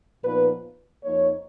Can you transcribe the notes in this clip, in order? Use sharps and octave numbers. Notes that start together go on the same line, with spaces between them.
A#2 F3 B3 D#4 B4
F2 F3 A#3 D#4 C#5